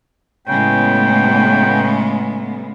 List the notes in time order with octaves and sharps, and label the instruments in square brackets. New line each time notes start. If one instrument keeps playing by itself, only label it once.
[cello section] A2 B3 [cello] C#3 G#3 [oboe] G5